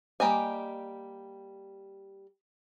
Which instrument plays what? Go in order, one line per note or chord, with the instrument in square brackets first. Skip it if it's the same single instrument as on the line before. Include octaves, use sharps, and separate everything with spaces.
[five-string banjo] G3 A#3 G4 D#5 G#5